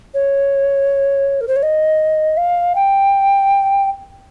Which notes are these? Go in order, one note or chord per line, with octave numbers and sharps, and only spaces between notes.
C#5
A#4
C5
C#5
D#5
F5
G5